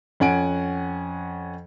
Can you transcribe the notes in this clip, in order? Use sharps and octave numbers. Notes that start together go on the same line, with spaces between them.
F2 C#4 F#5 G#5 D7